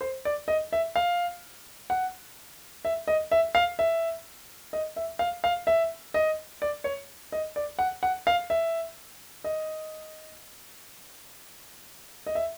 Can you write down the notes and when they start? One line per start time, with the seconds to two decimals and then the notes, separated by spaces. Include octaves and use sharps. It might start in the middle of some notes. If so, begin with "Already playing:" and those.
0.01 C5
0.25 D5
0.48 D#5
0.73 E5
0.96 F5
1.90 F#5
2.85 E5
3.08 D#5
3.32 E5
3.55 F5
3.79 E5
4.73 D#5
4.96 E5
5.19 F5
5.44 F5
5.67 E5
6.14 D#5
6.62 D5
6.84 C#5
7.32 D#5
7.56 D5
7.79 F#5
8.03 F#5
8.27 F5
8.50 E5
9.44 D#5
12.26 D#5
12.35 E5